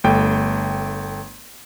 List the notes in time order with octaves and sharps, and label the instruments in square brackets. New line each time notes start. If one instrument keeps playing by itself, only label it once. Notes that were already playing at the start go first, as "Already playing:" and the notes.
[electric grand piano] G1 A3 G5